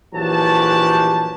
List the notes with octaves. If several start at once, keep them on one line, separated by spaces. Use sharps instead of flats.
A#1 E3 F#3 G4 A5